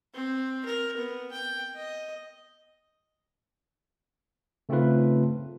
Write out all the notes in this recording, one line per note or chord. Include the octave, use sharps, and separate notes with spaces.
C4
A#4
B3
G5
D#5
C#3 A3 C4 D#4 F4 B4